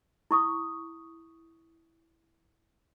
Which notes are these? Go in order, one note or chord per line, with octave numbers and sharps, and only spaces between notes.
E4 C#6 D#6